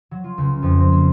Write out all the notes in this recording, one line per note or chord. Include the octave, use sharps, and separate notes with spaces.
F#3
F4
C#2
F2
C4
A#3